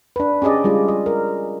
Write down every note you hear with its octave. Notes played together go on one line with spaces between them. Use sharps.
D4 B4
C#4 G4 G#4 D5 D#5
G3 G#3 F4
D#5
A#4